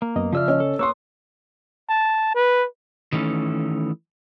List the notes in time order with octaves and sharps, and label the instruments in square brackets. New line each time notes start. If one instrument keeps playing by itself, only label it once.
[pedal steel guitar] A#3
[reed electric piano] F#2 B3 D#5
[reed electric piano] C#3 [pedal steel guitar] F3 E6 F6 [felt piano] F4 D5 E5
[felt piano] C#4 C#5 D#5
[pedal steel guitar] A4
[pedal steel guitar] A#3 B4 D#6 [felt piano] C#5 C6 [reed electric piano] C#6 E6
[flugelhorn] A5
B4
[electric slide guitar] D#3 E3 A3 C#4